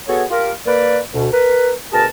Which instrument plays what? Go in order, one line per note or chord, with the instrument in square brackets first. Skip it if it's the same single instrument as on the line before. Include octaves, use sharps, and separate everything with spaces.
[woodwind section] B3 F#4 G#4 A4 C#5
F4 G4 A#4
A#3 B4 D5
D2 B2
A#4 B4
D2 B2 G#4 A#4 A5